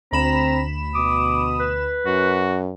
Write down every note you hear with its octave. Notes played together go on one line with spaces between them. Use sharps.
D2 C4 A#5 B5 E7
B2 D6 D#6
B4
F#2 F#4